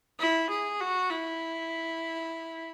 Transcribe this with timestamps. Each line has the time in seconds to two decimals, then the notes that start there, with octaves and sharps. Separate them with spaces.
0.19 E4
0.50 G#4
0.81 F#4
1.10 E4